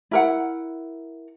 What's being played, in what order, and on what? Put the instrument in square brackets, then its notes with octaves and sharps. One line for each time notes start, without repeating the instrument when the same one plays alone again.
[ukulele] E4 A#4 F#5